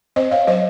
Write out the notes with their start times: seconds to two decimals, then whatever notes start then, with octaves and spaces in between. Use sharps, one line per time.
0.16 C4 C5 D#5
0.31 C#5 F5
0.47 F#3 C5 D#5